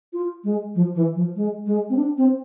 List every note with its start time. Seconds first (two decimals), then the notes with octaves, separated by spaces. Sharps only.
0.13 F4
0.44 G#3
0.75 F3
0.95 E3
1.15 F3
1.36 G#3
1.66 G#3
1.90 C4
1.96 D4
2.17 C4